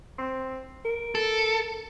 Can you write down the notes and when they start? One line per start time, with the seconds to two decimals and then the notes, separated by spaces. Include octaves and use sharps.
0.19 C4
0.85 A#4
1.15 A4